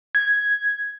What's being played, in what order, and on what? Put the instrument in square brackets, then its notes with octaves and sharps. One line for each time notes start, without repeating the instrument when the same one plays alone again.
[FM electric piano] G#6